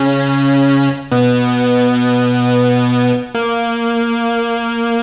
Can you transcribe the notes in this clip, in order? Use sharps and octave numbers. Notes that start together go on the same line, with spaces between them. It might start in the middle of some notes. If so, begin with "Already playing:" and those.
Already playing: C#3 C#4
B2 B3
A#3